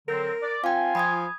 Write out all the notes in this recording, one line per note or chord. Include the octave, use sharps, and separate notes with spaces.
D3 F#3 C4 A#4
D5
C4 F4 F5 G5 G#5
F3 B5 D#6 G#6